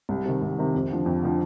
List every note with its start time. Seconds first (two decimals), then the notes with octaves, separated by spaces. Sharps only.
0.09 C2
0.26 C3 D#3
0.42 C2
0.58 C3 D#3
0.75 F2
0.90 D3 F3
1.06 F2
1.23 D3 F3